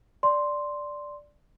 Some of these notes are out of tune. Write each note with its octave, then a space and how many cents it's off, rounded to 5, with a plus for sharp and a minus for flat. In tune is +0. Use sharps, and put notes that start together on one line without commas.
D5 +0 C6 +0